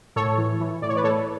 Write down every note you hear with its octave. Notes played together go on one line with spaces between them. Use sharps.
A2 A4 C#5
E3
E3
A2 D5
C#5
B4 D5
A2 A4 C#5